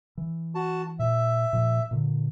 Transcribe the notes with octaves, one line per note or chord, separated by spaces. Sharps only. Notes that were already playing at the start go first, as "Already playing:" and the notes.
E3
F#4 A5
A#2 E5
A#2 F3
A#2 D3